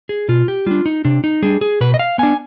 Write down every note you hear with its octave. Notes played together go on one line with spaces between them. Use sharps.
G#4
B2 F4
G4
G3 D4 F4
D#4
C3 D4
D#4
G3 D4 G#4
G#4
B2 B4
D#5
F5
B3 D4 G#5